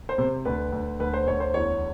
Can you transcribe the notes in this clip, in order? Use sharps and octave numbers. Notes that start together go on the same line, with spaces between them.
C5
C3
D2 B4
D2
D2 B4
C5
D2 C#5
C5
E2 C#5